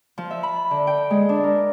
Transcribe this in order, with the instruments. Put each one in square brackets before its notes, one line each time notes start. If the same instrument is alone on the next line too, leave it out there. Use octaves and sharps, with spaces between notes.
[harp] F3
E5
B5
D3
G5
G#3
D4
A#4